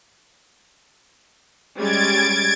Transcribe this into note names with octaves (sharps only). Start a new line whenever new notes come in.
G3 G#3 C#4 G#6 A6 D7